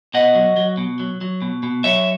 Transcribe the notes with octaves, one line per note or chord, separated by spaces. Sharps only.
B2 D#5 F#5
F#3
F#3
B2
F#3
F#3
B2
B2
F#3 C#5 E5